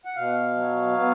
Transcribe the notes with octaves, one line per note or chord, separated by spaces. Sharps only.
F#5
B2 F5
F#3
B3